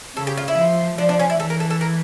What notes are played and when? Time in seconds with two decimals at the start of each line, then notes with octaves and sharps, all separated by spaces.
0.16 C#3 A4
0.27 G4
0.37 F4
0.48 E4
0.58 F3
0.98 F3 D4
1.09 D4
1.19 C#4
1.30 E4
1.39 E3 A4
1.50 A#4
1.60 A4
1.70 A4
1.81 A#4